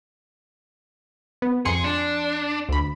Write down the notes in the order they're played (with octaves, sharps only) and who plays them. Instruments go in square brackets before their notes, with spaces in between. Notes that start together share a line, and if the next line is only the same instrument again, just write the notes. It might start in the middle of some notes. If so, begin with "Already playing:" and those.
[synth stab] B3
[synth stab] F2 C6 C#7 [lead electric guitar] G#4
[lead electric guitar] D4
[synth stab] D2 B5